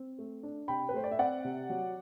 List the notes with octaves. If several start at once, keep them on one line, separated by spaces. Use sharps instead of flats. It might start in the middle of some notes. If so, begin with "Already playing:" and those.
Already playing: C4
A3
D4
C3 G5 B5
B4
A3 C5
D5
E5
C4 D5 F#5
C3
F#3